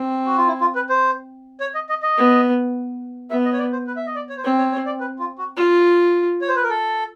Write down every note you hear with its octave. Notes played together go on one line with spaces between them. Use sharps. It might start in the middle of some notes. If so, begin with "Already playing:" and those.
Already playing: C4
F#4
F4
E4
F4
B4
C5
C#5
D#5
D#5
D#5
B3
B3 E5
D#5
C#5
D5
C5
B4
E5
D#5
D5
C#5
C5
C4 C#5
C#5
C#5
D5
B4
F4
F#4
F4
C#5
C5
B4
A#4
A4